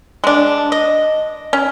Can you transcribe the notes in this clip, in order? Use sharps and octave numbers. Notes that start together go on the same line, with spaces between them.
G#3 D4
D#5
C#4